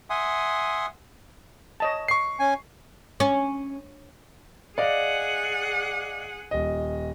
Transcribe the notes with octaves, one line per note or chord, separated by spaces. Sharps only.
E5 F#5 G#5 C6 D#6
C#5 D#5 A5
C#6 C7
C#4 G#5
C#4
G#4 D5 D#5 F5 F#5
D#1 D#5